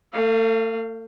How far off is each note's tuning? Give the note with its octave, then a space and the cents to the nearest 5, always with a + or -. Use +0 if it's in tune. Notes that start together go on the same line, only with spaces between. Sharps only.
A3 +40 F5 -15